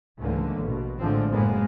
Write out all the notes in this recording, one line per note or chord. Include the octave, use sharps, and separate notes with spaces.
C#2 G#2 D3 E3 A3 A#3
A#1 B2
A#1 A2 D3 F3 G#3 C4
F#1 A2 G#3 A#3 B3